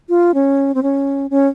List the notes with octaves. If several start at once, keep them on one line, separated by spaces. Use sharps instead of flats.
F4
C#4
C4
C#4
C#4